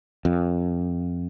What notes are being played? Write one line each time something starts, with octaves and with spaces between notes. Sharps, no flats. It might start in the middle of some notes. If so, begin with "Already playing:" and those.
F2